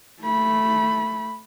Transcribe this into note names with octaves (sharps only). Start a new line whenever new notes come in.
A3 B5